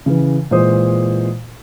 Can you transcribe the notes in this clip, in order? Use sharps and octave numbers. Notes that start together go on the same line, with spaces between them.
C#3 E3
A#2 E3 G#3 C5 D#6